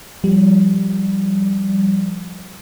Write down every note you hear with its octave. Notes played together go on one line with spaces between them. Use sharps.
F3 G3